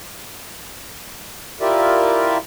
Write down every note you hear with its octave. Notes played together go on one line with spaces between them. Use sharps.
E4 F4 G4 A#4 D5 E5